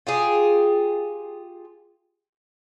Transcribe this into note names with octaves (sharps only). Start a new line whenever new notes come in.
F4 G4 G#4